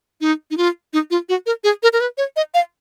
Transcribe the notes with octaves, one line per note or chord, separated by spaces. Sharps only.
D#4
D#4
F4
D#4
F4
F#4
A#4
G#4
A#4
A#4
B4
C#5
D#5
F5